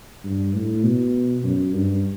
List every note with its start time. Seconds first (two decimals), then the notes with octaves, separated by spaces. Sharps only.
0.24 G2
0.54 A2
0.84 B2
1.44 F#2
1.74 G2